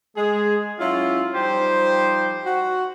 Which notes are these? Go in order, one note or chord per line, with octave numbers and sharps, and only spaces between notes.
G#3 G#4
F#3 C#4 E4 F4
F3 G3 D#4 G4 C5
F#4